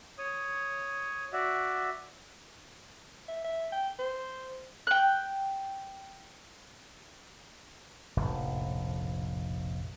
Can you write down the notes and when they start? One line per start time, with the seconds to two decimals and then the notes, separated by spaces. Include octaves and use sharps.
0.18 C#5 D#6
1.33 F#4 D5 E5
3.28 E5
3.44 E5
3.72 G5
3.99 C5
4.87 G5 F#6
8.17 F1 A#1 A2